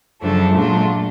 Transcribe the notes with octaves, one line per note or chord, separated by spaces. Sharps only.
F#2 C#3 F3 A3 D4
A#2 F#3 A3 D4 F4